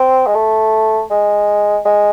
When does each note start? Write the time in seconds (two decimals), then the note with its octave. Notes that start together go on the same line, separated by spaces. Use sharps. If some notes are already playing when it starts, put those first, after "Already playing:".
Already playing: C4
0.27 G#3
0.35 A3
1.10 G#3
1.85 G#3